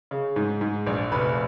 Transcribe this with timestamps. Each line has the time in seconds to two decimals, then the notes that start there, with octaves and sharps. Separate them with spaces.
0.11 C#3
0.36 G#2
0.61 G#2
0.86 A#1
1.12 F1 B4